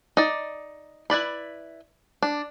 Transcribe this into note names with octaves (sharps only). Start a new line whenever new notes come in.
D#4 D5
E4 B4 D5 B5
D4